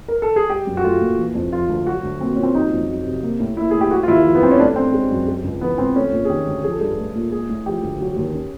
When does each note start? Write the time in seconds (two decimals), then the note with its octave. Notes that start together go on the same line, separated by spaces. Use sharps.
0.08 A#4
0.22 A4
0.36 G#4
0.50 G3 G4
0.67 F#2
0.77 F#4
0.84 A3 F4
1.01 A#2
1.18 E3
1.35 F2
1.52 F3 F4
1.69 D2
1.87 F#3 F#4
2.03 D2
2.21 A#3 C4
2.36 A#2 C#4
2.43 C4
2.54 F#3 D#4
2.71 F2
2.88 F#3
3.05 C3
3.23 A#3
3.40 A2
3.57 A#3 E4
3.71 A2 G#4
3.81 G4
3.91 G#3 F#4
4.03 F4
4.08 D#2 E4
4.25 F3
4.35 B3
4.42 G2 C4
4.51 C#4
4.59 A3 D4
4.76 G#2 C4
4.94 G#3
5.11 F#2
5.27 G#3
5.44 C#2
5.61 E3 B3
5.78 C#2 C4
5.96 A3 C#4
6.12 A#2
6.25 G#4
6.30 D#3 G4
6.47 D2
6.64 F3 G#4
6.71 A4
6.80 G2 G#4
6.98 A3
7.15 A#2
7.32 G#3 G#4
7.49 A2
7.66 F3 G4
7.83 D2
8.01 F#3
8.17 D#2
8.34 C#4